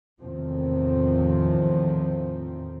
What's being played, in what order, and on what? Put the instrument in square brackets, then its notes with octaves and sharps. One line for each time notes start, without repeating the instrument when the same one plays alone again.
[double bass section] E2 A2 C3 D#3 F3 C4